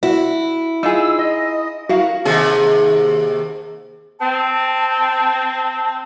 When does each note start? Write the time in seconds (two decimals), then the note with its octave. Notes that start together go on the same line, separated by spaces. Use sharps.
0.03 E4 F#4
0.83 D#4 F4 G#4 E6
1.19 D#5
1.89 E4 F#4 A#4 F5
2.25 D#2 C3 G#4
4.20 C4 A5